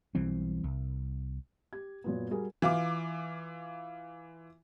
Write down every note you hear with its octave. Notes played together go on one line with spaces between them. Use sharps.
B1 E3 G3 C4
C2
G4 G#6
F#2 A#2 B3
G3 F#4 G#4 A#4
E3 F4 D6